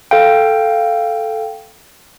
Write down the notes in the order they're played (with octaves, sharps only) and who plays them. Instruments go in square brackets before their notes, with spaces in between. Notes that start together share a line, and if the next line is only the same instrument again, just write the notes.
[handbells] A4 F5 G5